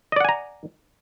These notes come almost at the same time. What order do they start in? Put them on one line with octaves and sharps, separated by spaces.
D#5 D5 F#5 G#5 A#5